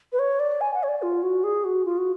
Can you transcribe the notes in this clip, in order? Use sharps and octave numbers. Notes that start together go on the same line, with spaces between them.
B4
C#5
D5
G#5
F#5
C#5
D5
F4
F#4
G#4
F#4
F4
F#4